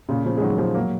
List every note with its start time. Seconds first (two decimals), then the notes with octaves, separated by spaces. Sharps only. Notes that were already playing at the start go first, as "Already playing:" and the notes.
0.08 A#2 C#3
0.25 C#3 F3
0.38 G#3
0.42 D#3 F#3
0.58 F3 G#3
0.74 F#3 A#3